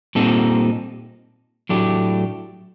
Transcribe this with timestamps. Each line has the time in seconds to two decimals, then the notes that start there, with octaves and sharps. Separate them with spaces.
0.15 A#2 G3 C4 D#4 A4
1.69 A2 F#3 A3 D4 G4